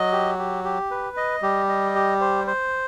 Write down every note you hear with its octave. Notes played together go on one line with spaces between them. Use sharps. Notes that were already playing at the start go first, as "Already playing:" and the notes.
Already playing: F#3 D#5
G4
G4
G4
B4
D#5
G3 G4
D#5
G4
C5
C5